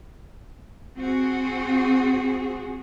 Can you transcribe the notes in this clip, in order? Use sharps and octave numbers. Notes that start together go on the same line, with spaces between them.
C4 F#4 G#4